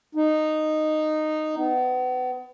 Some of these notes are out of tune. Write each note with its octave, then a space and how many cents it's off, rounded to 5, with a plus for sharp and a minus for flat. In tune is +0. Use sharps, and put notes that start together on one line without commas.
D#4 -10
B3 +35